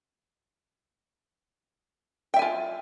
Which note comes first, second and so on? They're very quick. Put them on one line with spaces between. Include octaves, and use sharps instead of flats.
G5 E5 G#5 F4